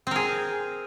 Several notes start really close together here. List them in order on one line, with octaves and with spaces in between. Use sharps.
C4 A#4 G#4